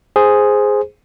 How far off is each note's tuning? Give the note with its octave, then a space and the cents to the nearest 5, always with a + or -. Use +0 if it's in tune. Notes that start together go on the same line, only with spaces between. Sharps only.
G#4 +0 C5 +0